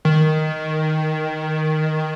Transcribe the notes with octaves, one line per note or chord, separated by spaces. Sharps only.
D#3